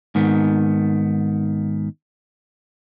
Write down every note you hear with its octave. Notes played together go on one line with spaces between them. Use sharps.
G#2 D#3 B3